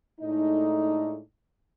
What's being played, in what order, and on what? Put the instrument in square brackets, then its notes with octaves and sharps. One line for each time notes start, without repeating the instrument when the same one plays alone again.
[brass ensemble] A2 G#3 A3 D4 D#4